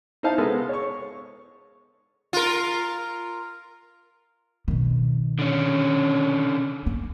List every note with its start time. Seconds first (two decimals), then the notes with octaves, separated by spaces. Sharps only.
0.23 D#4 E4 C5 F5 A5
0.38 G#3 B3 A4 A#4
0.69 C#5 C#6
2.33 F4 A#4
4.68 B2 D#3
5.39 D3 C#4
6.86 A#3